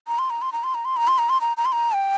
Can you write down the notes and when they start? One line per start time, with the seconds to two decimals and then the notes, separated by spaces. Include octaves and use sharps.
0.07 A#5
0.19 C6
0.30 A#5
0.42 C6
0.52 A#5
0.64 C6
0.75 A#5
0.85 C6
0.97 A#5
1.08 C6
1.18 A#5
1.29 C6
1.41 A#5
1.57 A#5
1.65 C6
1.72 A#5
1.94 G5